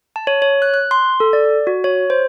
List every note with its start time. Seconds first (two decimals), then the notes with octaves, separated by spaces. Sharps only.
0.16 A5
0.27 C#5
0.42 C#5
0.62 F#6
0.74 F#6
0.91 C6
1.20 A4
1.33 D5
1.67 F#4
1.84 C#5
2.10 C5